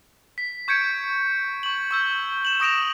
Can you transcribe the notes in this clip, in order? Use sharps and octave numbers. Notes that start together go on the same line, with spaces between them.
B6
C#6 G6 G#6 C#7 D7
C#6 F#7
C#6 E6 G6
E7 F#7
C#6 D#6 A#6 D7 E7 F7